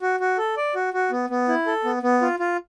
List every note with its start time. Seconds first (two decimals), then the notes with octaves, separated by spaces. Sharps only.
0.02 F#4
0.20 F#4
0.38 A4
0.57 D5
0.75 F#4
0.94 F#4
1.11 B3
1.30 B3
1.48 E4
1.67 A4
1.84 B3
2.03 B3
2.22 F4
2.39 F4